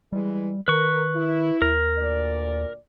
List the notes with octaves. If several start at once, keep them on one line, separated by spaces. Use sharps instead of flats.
E3 G3 G#3
D#3 A#4 B4 C#6
E4
D#2 A#4
D2 A#2 D5